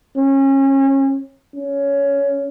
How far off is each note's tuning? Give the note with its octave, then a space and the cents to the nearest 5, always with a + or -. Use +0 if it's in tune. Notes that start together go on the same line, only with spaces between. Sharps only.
C#4 -30
C#4 +15